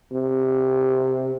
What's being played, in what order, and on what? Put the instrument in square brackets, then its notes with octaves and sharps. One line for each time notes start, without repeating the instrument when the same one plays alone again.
[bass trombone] C3